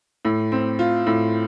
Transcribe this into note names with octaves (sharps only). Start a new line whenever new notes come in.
A2
C4
F4
A2